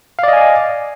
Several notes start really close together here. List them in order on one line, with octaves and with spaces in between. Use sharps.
F5 D5 D#5 G#5